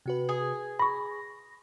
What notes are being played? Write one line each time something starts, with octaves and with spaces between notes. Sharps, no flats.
C3 F#4 B4
G#4
B5 C#6 A#6